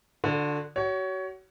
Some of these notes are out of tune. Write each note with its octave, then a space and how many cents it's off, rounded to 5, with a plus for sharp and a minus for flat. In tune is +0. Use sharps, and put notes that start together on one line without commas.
D3 +5 F#4 -35
F#4 +35 C#5 +20